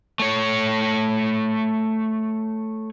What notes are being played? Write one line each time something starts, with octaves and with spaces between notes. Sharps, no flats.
A3 C#5